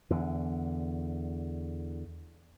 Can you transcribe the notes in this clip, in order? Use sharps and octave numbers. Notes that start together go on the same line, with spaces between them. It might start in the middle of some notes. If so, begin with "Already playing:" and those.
E2 D3